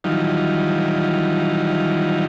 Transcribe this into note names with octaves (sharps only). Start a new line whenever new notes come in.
D#3 E3 F#3 G3 D#4 F4